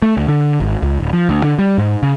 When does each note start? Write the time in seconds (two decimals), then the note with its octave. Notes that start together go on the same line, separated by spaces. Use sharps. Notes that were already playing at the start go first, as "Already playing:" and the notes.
0.02 A3
0.17 D2
0.28 D3
0.60 G#1
0.82 C#2
1.00 D1
1.13 F3
1.29 D2
1.44 D3
1.59 G3
1.78 G#2
2.03 C#3